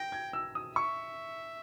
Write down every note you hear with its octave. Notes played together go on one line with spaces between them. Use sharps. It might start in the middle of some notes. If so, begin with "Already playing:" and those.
Already playing: G5 A#6
G#6
E6
D#6
E5 C#6